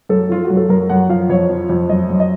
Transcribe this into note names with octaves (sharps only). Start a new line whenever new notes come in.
F#2 A4
F3 F4
F#4
F#2
A4
F#2 A#4
F#2 F#5
F3 F5
F2 C#5
F3
F2
F#2 D#5
F#2
D#5